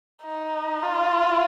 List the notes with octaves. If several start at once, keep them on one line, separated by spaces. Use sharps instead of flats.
D#4
F4